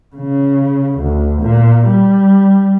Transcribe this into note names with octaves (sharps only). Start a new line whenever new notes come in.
C#3
D2
A#2
G3